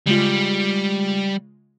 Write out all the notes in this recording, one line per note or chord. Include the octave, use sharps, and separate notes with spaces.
C#3 G3 G#3 F4